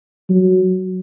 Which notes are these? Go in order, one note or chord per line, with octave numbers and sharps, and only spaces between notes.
F#3